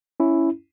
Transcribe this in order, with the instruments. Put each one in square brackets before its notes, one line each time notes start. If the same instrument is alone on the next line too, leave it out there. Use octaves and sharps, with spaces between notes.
[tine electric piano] C#4 E4